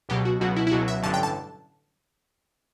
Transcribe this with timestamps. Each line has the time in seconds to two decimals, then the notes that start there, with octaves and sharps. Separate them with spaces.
0.09 C#2 B2 F#3 G4
0.25 F#4
0.40 C#2 B2 F#3 F#4
0.56 E4
0.67 E4
0.71 C#2 B2 F#3 F#4
0.88 E5
1.03 A1 G2 D3 F#3 A5
1.14 G5
1.23 A5